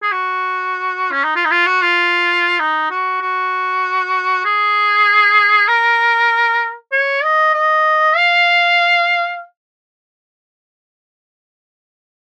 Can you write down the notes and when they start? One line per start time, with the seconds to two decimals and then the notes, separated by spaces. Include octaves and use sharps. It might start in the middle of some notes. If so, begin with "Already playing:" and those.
0.03 G#4
0.12 F#4
1.11 C#4
1.24 D#4
1.36 F4
1.45 D#4
1.51 F4
1.67 F#4
1.82 F4
2.59 D#4
2.90 F#4
3.21 F#4
4.45 G#4
5.68 A#4
6.92 C#5
7.23 D#5
7.54 D#5
8.16 F5